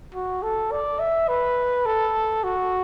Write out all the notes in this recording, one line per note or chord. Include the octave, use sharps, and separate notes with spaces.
F#4
A4
D5
E5
B4
A4
F#4